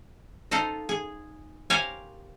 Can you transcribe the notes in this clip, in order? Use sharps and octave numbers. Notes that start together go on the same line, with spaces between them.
D#4 F4 A4 C5 D#5
G#4
G4 A#4 C5 C#5 F5 G#5